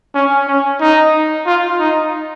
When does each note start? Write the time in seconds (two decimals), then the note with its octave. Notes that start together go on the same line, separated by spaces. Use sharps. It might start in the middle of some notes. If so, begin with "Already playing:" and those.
0.15 C#4
0.47 C#4
0.81 D#4
1.46 F4
1.79 D#4